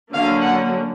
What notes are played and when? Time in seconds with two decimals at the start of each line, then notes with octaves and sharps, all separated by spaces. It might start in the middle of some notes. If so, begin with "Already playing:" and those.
0.13 D3 F#3 A#3 C#4 F5
0.41 F#5